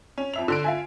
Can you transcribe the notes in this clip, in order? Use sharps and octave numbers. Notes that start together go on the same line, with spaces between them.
C#4
F2 E5 F7
D3 C6 D7
F4 E5 G#5